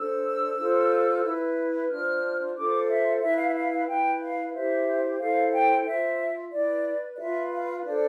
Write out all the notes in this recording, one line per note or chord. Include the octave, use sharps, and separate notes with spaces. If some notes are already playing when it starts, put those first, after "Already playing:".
Already playing: D4 A4 C5 E6
F4 A4 C5
E4 B4
D4 F4 C5 F6
F4 A4 C5 D6
E5
E4 B4 E5
F5
E5
F5
F5
E4 B4 G5
F5
E4 G4 C5 E5
E4 A4 C5 F5
G5
F4 C5 E5
E4 B4 D5
D5
F4 B4 E5
F5
D4 A4 C5 D5